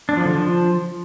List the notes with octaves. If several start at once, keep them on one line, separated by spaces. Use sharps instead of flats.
D4
F3
D3
F3